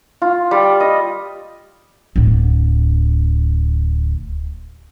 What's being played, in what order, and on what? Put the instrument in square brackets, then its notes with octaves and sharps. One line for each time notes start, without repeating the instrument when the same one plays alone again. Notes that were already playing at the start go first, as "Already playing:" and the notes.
[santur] F4
G3
D#5
[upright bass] D1 D3